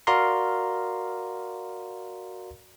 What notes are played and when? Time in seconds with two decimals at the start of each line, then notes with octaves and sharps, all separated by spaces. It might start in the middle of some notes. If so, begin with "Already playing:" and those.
0.07 F#4 A#4 D5 F5 A#5 C6